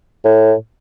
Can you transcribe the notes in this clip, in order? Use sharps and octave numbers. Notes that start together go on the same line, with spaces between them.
A2